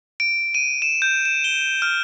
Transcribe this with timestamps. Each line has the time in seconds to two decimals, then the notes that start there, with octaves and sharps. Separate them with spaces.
0.20 D7
0.55 D#7
0.82 E7
1.02 G6
1.25 E7
1.44 G7
1.82 F6